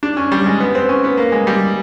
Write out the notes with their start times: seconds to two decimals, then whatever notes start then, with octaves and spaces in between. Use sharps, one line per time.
0.03 D4
0.17 C#4
0.32 G3
0.46 G#3
0.60 B3
0.75 C4
0.89 C#4
1.04 B3
1.17 A#3
1.32 G#3
1.47 G3